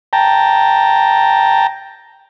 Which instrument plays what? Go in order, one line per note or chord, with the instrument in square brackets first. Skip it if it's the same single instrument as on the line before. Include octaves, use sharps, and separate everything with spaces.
[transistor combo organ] G5 A5 A#5